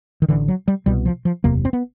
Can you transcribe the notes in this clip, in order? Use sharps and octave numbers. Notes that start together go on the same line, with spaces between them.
D#3
A1 G2 D3 E3
F#3
G3
C2 B2 G3
F3
F3
F#1 E2 C3 A#3
C4
B3